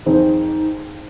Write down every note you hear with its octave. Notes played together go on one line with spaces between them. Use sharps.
F2 D#3 C4 D#4 G#4 C5